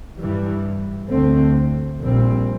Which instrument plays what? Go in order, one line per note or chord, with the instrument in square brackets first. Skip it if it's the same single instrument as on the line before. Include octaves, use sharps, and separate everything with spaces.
[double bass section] G2 E3 G3
D2 D3 A3 C4
A#1 A#2 G3 C4